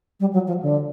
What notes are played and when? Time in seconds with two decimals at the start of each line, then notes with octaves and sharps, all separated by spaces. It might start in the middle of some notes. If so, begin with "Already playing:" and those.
0.20 G3
0.33 F#3
0.48 F3
0.62 D3